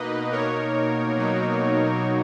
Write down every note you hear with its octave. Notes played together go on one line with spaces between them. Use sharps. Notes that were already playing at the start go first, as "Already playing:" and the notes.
Already playing: B2 A#3 D#4 B4 D#5
A#4 C#5
B2 F#3 A#3 D#4